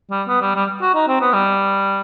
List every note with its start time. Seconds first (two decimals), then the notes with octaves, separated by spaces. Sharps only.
0.10 G3
0.28 B3
0.42 G3
0.55 G3
0.82 F#4
0.95 D#4
1.08 C4
1.21 B3
1.33 G3